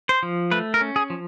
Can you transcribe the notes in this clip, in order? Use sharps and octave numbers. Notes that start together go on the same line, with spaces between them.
C5
F3
A3 B4
A#4
C#4
G#4
F3